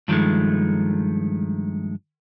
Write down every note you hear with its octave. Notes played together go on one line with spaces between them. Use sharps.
G2 D#3 F3 F#3 G#3 A3